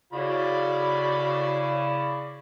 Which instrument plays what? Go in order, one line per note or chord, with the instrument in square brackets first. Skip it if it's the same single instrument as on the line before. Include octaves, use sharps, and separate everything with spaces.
[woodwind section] C#3 E4 [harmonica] F#4 C#5 B5 [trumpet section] D5